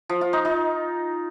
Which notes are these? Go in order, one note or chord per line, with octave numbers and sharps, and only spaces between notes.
F3
F4
D#4
D#4